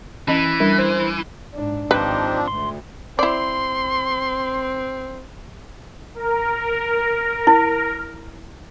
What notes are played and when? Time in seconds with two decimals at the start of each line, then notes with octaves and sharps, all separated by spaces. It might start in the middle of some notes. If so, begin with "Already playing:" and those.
0.28 E3 C#4 D#5 B5
0.60 G3 D4 A#4
0.78 C5
1.54 G#2 D4
1.91 G#1 F3 C4 D4 D#4 G4 B4 C5
2.48 D2 C6
3.19 C4 E4 D5 C6
6.15 A#4
7.47 E4